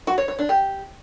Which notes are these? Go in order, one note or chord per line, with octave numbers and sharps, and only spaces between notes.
F#4
C#5
C#5
D4
G4